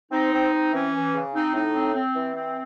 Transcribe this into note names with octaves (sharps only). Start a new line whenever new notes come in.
C4 D#4
C4
C4
E3 C#4
E3
C#3
C4 D#4
A2 D#4
C4
C4
E3
C4